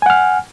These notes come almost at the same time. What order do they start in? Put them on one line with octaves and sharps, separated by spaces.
G#5 F#5 F6